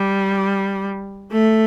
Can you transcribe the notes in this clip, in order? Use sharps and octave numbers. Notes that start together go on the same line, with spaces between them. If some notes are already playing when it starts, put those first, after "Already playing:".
Already playing: G3
A3